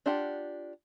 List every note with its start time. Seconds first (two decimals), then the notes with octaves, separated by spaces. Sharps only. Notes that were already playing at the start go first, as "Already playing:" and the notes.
0.06 D4 F4 G4 F#5